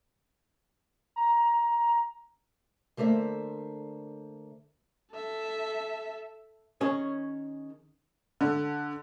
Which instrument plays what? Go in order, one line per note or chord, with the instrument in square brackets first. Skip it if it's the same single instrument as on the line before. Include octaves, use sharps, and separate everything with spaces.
[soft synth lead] A#5
[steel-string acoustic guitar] D3 A3 A#3 C5 E5
[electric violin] A4 E5
[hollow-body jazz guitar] D#3 C#4 G#4 C#5
[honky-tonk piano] D3